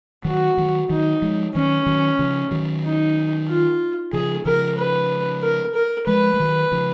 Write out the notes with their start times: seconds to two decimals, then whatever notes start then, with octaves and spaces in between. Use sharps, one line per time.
0.25 D#3 F#3 F#4
0.58 D#3 F#3
0.90 D#3 F#3 D#4
1.22 F3 G#3
1.54 D#3 F#3 C#4
1.86 D#3 F#3
2.19 C#3 F3
2.51 D#3 F#3
2.84 D#4
3.48 F4
4.13 C#3 F3 G#4
4.45 C#3 F3 A#4
4.78 B4
5.43 A#4
5.75 A#4
6.07 F3 G#3 B4
6.34 G#3
6.40 D#3 F#3
6.72 C#3 F3